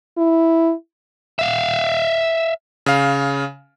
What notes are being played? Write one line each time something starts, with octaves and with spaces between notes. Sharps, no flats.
E4
E5 F5
C#3 F5